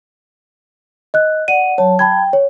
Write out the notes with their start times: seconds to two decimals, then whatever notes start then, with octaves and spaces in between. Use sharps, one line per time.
1.14 D#5 F#6
1.48 D5 F#5 D#7
1.78 F#3 C#5 A5
1.99 G5 A5 B5 G#6
2.33 C#5